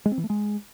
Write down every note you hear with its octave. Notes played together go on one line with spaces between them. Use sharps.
G#3
C4
E3
A3
G#3